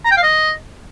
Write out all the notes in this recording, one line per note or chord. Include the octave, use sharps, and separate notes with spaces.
A#5
G5
F5
D#5